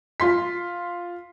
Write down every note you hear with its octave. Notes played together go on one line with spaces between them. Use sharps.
F4 C6 B6